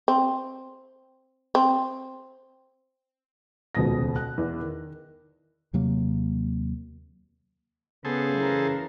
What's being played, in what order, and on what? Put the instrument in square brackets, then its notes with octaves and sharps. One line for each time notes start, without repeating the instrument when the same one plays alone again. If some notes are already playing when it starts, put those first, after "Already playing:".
[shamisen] C4
C4
[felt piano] D#1 C#2 B2 D#6 A#6
F#6
E2
D#3
[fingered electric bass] D#2 C3 F#3 A#3
[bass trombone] C#3 [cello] B3 [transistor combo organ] G#4 A4 C5
[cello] E3 A#4